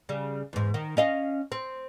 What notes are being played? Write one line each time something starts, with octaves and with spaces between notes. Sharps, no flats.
C#3 G3
E2 G#2
D#3
C#4 D#5 F5
C4